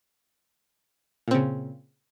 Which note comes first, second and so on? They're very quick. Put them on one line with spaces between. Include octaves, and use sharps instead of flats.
A#2 C4 C#3